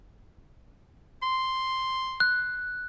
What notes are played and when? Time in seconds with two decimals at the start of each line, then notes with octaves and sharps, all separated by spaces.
1.22 C6
2.20 F#6